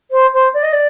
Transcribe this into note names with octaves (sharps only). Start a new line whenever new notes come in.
C5
C5
D5
D#5
D5